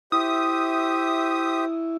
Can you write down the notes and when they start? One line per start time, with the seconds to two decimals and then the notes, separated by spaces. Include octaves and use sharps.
0.12 E4 G4 C5 E5 D#6